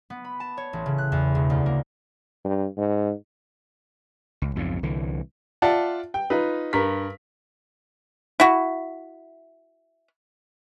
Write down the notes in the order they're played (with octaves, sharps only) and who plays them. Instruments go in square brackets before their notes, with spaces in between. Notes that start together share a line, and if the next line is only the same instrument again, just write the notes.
[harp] B3
B5
A5
C#5
A1
C#3
F#6
E2
E1
D2
A#3
[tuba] G2
G#2
[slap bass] C#2
B1 F2 G#2 C#3
C2 D3 E3
[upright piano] F4 D5 E5 F#5 A5
G5
D#4 F4 B4
G2 A#4 B6
[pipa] E4 F#4